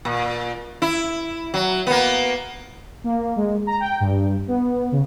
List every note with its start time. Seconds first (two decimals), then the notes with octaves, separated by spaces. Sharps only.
0.05 A#2
0.82 E4
1.54 F#3
1.87 A#3 B3
3.04 A#3
3.36 G#3
3.67 A#5
3.80 G5
4.00 G2
4.48 B3
4.92 C#3